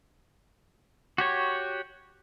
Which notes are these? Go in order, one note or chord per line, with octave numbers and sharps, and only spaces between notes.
F#4 G4 C#5